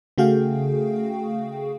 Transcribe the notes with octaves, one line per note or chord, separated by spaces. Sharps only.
C#3 A3 F#4 G#4 F5 G5